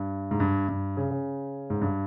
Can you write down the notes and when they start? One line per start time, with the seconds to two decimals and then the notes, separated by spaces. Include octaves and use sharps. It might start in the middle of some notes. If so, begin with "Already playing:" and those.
Already playing: G2
0.31 G#2
0.40 G2
0.68 G2
0.97 C#3
1.11 C#3
1.70 G#2
1.82 G2